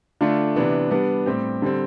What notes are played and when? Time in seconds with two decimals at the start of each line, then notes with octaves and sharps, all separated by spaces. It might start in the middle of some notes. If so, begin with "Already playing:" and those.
0.21 D3 A3 D4 F4
0.56 C3 E3 B3 D4
0.91 G3 B3 D4
1.26 A2 G3 C4 G4
1.62 D3 G3 C4